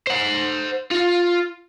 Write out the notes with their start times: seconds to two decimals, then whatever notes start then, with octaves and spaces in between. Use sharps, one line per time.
0.07 C5 F#5
0.91 F4